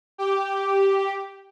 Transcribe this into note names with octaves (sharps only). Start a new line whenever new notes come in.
G4